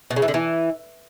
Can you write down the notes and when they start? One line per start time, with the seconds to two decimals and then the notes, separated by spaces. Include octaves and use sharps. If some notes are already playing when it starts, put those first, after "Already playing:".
0.11 B2
0.16 C#3
0.22 E3
0.28 D3
0.34 E3